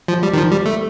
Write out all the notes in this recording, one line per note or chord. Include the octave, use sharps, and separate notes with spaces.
F3
G3
D#3
F3
G3
A3